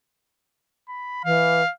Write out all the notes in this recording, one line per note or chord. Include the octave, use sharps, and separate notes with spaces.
B5
E3 F5